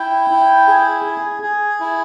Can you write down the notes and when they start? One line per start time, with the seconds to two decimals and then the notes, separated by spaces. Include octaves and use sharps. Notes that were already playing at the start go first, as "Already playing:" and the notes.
Already playing: E4 G5
0.30 E4
0.67 G#4
1.05 G#4
1.42 G#4
1.80 E4